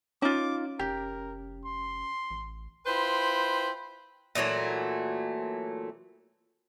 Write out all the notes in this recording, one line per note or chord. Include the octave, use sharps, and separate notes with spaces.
C#4 D#4 F4 D6
F1 G4 A#4
C6
A1
E4 F4 B4 C5 G5 B5
A#2 E3 F#3 A3